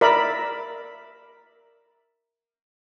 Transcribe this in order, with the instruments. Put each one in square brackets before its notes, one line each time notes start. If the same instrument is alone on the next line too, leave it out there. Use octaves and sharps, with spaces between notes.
[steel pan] A#4 D5 E5 B5